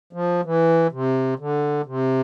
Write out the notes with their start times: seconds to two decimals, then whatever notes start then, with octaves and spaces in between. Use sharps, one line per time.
0.13 F3
0.45 E3
0.92 C3
1.39 D3
1.86 C3